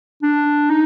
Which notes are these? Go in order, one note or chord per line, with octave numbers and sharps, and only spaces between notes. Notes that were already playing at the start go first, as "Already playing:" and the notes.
D4
D#4